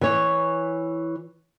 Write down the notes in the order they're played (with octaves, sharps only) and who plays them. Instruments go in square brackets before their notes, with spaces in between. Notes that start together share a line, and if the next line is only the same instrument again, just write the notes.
[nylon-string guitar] E3 C#5